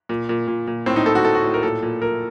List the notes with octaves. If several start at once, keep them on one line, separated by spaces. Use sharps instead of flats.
A#2
A#2
A#2
A#2
A2 C4
D#4
A2 A4
F#4
A2 A4
F#4
A2
A#4
A#2 A4
A#2
A#2 A#4